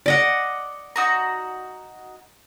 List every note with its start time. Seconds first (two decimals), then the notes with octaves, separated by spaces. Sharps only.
0.06 D5 D#5 F#5
0.96 D#4 F#4 A#5